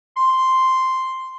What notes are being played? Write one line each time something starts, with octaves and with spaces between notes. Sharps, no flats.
C6